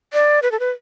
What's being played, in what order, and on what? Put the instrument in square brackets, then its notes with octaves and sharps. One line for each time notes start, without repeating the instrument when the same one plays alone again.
[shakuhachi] D5
B4
A4
B4